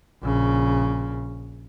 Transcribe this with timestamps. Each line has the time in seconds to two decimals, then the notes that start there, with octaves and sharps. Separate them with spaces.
0.23 A#1 C#3